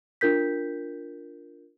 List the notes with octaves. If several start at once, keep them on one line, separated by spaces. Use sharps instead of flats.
D4 F4 A#4 G6 B6